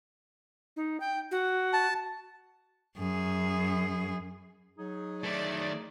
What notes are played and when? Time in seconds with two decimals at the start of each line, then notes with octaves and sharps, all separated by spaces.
0.76 D#4
1.00 G5
1.31 F#4
1.73 A5
2.97 F#2 G#4
4.78 F#3 D#4 G#4
5.24 D#3 A3 D5